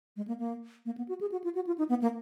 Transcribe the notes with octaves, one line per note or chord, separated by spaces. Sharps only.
G#3
A#3
A#3
A#3
B3
F#4
G#4
F#4
F4
F#4
F4
D#4
B3
A#3